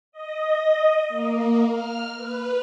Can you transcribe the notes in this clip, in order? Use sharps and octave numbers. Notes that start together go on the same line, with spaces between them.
D#5
A#3
F6
B4